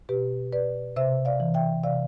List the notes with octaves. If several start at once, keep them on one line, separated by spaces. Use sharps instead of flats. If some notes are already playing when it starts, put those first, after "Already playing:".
B2 G4 B4
B4 D5
C3 C5 E5
D5 F5
E3
E5 G5
C3 D5 F5